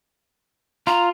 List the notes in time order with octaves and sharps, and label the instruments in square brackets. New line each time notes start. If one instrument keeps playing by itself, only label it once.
[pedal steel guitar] F4 [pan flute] A#5